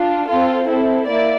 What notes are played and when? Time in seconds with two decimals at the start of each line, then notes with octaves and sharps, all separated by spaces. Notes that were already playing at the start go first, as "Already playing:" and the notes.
Already playing: D4 F4
0.28 C4 F4 A4
0.68 C4 E4 A4
1.08 A#3 E4 D5